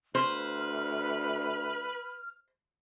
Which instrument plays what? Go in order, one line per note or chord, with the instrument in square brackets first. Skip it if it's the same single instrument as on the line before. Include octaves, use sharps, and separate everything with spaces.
[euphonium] D2 [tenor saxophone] B4 [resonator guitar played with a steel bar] C5 [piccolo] F6